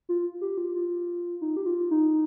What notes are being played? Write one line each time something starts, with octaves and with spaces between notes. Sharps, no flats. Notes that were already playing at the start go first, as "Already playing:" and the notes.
F4
G4
F4
F4
D#4
G4
F4
D#4